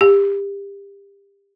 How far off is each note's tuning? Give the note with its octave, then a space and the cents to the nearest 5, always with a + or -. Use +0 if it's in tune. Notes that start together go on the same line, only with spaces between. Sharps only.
G4 +30